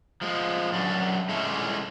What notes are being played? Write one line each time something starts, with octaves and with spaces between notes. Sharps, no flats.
F3 G#3
F#2 F#3 D4
G#3 A3 C#4 D4 E4